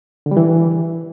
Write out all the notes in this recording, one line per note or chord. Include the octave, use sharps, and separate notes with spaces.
D3
G3
E3